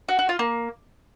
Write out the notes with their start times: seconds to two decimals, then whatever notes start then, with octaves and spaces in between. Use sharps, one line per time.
0.09 F#4
0.19 F#4
0.29 F4
0.39 A#3